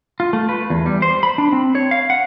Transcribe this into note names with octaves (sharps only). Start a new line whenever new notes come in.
F4
A3
B4
E2
G3
C5
B5
D4
C4
C#5
F5
F#5